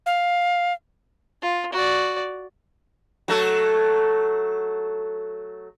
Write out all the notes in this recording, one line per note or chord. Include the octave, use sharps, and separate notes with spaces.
F5
F4
F#4 D5
F#3 A3 A4